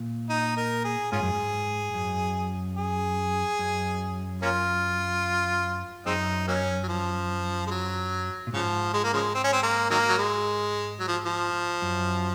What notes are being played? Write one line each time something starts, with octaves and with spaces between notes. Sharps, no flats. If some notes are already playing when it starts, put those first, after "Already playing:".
Already playing: A#2
D#4
A#4
G#4
G#2 C#4 F4 G#4
F#2
G#2
F#2
G#4
F#2
A#3 C#4 F4
F#2 G#3 C4 D#4
F#3 A#3 C#4
F#3
F3
G#3
F#3
A#2
G#2 C#3 F3
G#3
A#3
C#3 F3 G#3
C4
C#4
C4
A#3
D#3 F#3 A#3
F#3
G#3
F#3
F3
F3
F#2